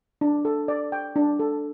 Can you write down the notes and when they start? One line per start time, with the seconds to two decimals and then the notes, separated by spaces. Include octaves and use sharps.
0.21 D4
0.45 A4
0.68 D5
0.92 G5
1.16 D4
1.39 A4